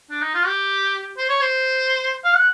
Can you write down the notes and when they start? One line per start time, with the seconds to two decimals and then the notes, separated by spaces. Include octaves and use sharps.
0.10 D4
0.22 D#4
0.34 F4
0.46 G4
1.18 C5
1.29 C#5
1.41 C5
2.24 F5
2.36 F#5